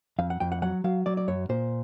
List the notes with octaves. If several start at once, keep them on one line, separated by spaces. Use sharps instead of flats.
F2 F5
F#5
F2 G5
F#5
F#3 F#5
F#3 F5
F#3 D5
D5
F#2 C#5
A#2 C5